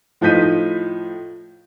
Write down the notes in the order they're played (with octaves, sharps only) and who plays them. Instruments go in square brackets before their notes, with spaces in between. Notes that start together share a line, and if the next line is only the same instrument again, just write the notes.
[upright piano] A2 F3 D#4 G6 B6 D#7